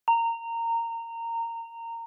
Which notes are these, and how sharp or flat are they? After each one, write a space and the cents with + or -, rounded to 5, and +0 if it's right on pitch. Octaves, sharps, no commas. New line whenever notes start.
A#5 -20